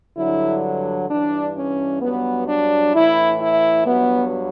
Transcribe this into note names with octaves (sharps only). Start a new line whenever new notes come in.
G2 D3 F#3 E4
G2 E3 D4
C#4
G2 F#3 B3
D4
A2 E3 E4
E4
G2 F#3 B3